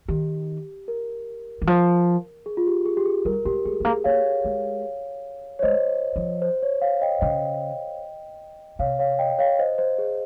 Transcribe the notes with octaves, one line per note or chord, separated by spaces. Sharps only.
D#3 G4
A#4
D#3
F3
G#4
F4
G4
G#4
G4
G#4
G3 A#4
G#3 G4
G#3 G#4
G#3
A#3 G#4
A#3 C#5 F5
G#3
C#5
G#3 C5 D#5
F3
C5
C#5
C#5 F5
D#5 G5
C#3 D#5 G5
C3 C#5 F5
C#5 F5
D#5 G5
C#5 F5
C5 D#5
C5
G#4